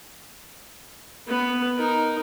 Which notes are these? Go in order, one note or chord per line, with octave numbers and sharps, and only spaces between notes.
B3 B4
D#4 A#4